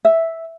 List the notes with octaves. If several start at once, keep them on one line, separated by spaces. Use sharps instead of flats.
E5